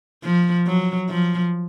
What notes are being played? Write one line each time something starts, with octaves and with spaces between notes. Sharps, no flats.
F3
F#3
F3